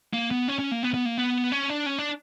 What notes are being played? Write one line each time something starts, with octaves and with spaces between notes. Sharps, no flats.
A#3
B3
C#4
C#4
A#3
B3
B3
A#3
B3
C#4
D4
C#4
D4